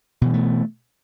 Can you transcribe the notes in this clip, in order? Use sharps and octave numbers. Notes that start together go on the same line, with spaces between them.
B2 E3 G3 A3